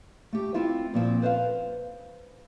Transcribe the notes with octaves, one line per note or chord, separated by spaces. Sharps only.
A3 G4
C4 E4 F4 E5
A#2 F3 C4
B4 C5 E5 F5